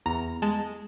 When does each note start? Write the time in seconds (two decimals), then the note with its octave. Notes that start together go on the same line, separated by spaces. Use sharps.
0.06 E2 A#5
0.42 G#3 A5